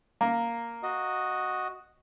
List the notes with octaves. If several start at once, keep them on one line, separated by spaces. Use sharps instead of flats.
A#3 A#5
F#4 D#5